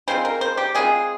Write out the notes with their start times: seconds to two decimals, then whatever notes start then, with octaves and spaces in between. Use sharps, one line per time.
0.08 E3 G#3 C4 F4 C5
0.25 A#4
0.41 C5
0.57 G4
0.74 E3 G#3 C4 F4 G#4